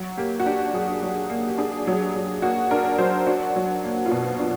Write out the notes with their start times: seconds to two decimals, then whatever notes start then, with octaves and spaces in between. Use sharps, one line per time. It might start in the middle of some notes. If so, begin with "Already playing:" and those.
Already playing: F#3 F#4
0.18 A#3 G4
0.40 F#4
0.46 D4 G4
0.73 F#3 G#4
1.02 F#3
1.30 A#3
1.48 G4
1.58 D4 G#4
1.87 F#3
1.93 G#4
2.01 G4
2.15 F#3
2.42 A#3 F#4
2.71 D4 A#4
2.98 F#3 C5
3.27 D4 F#4
3.56 F#3
3.84 A#3
4.06 F4
4.11 B2 F#4
4.39 D4